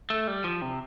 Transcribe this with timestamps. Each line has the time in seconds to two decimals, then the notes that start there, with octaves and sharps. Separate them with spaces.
0.10 A3
0.27 G3
0.44 F3
0.62 C3